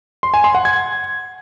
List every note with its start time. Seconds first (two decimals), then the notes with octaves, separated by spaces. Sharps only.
0.23 C6
0.34 G#5
0.44 C6
0.55 F#5
0.65 G#6